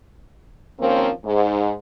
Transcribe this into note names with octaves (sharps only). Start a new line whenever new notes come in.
D#2 F3 A#3 C4 C#4 A#4
G#2